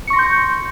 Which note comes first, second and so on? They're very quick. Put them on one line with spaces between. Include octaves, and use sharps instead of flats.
C#7 C#6 A#6 C6 G6